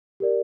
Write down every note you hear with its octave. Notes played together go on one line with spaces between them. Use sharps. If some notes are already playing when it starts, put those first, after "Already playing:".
G4 A#4 D5